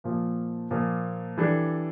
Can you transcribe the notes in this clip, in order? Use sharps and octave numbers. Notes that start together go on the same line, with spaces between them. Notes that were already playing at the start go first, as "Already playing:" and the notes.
A#2 F3 A#3
A#2 F3 A#3
E3 G3 D4 A4